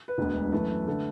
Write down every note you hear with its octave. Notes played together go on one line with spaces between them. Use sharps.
B4
E1 D2 D3 G#3 B3
F#2 E3 A3 B4
D3 A3